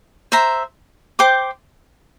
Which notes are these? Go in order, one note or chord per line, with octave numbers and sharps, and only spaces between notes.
C5 E5 A#5
C5 G5 D6